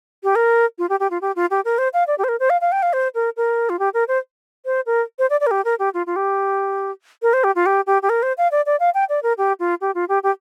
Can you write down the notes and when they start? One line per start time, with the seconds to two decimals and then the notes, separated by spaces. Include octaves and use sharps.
0.23 G4
0.35 A#4
0.79 F4
0.90 G4
1.00 G4
1.11 F4
1.22 G4
1.36 F4
1.51 G4
1.65 A#4
1.78 C5
1.94 F5
2.07 D5
2.18 G4
2.24 C5
2.29 A#4
2.40 C5
2.50 F5
2.61 F5
2.72 G5
2.83 F5
2.93 C5
3.15 A#4
3.37 A#4
3.70 F4
3.79 G4
3.94 A#4
4.08 C5
4.66 C5
4.86 A#4
5.19 C5
5.30 D5
5.41 D5
5.47 A#4
5.51 G4
5.65 A#4
5.79 G4
5.94 F4
6.07 F4
6.16 G4
7.22 A#4
7.33 C5
7.44 G4
7.56 F4
7.66 G4
7.87 G4
8.02 G4
8.09 A#4
8.23 C5
8.38 F5
8.52 D5
8.66 D5
8.80 F5
8.94 G5
9.09 D5
9.23 A#4
9.38 G4
9.60 F4
9.81 G4
9.95 F4
10.09 G4
10.23 G4